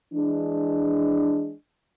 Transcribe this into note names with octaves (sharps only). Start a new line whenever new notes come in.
E3 G#3 D4